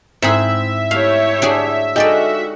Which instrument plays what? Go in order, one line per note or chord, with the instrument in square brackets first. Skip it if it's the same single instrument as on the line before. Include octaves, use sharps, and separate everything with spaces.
[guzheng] G#2 G#4 [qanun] C4 E4 B5 [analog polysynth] E5
[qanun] A3 [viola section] E4 G4 C#5 [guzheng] F5
[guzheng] D4 F#4 G#4
[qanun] G#3 D#4 F5 [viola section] F#4 [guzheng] G4 A4 D5